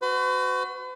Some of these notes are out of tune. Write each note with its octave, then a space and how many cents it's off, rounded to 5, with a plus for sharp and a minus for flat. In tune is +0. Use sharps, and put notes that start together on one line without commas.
F#4 +0 B4 +45